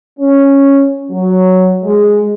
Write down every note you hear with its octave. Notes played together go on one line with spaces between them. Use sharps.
C#4
F#3
G#3